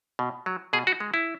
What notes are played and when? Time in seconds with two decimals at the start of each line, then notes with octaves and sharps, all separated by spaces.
0.19 B2
0.46 F#3
0.73 B2 G#4
0.87 F#4
1.00 G#3
1.14 E4